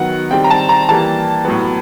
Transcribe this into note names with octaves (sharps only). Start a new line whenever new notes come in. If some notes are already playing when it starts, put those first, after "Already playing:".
Already playing: D#3 F#3 B3 F#5
D#3 G3 C4 G5
A#5
A5
A#5
E3 G3 A#3 A5
A2 F#3 B3